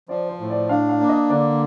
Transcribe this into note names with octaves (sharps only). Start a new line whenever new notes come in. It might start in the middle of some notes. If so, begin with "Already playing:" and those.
F3 D5
C5
A2
D5
D4 F5
F5
A#3
D#5
D3 D5